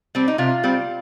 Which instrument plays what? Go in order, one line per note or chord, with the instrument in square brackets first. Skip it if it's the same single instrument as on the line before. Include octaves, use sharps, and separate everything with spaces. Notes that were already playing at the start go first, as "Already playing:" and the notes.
[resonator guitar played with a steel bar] G3 C4
D#4
C3 F4
G3 C4